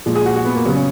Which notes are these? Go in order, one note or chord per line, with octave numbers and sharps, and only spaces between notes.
A#2 F3 G#3
G#4
F#4
F#4
B3
A#3
C#3 F#3 B3
C#4